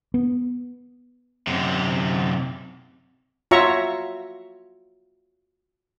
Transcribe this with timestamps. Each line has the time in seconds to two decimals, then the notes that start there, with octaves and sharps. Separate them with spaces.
0.14 B3
1.47 F#2 C3
3.51 F4 F#4 C#5 E5 A#5 C#6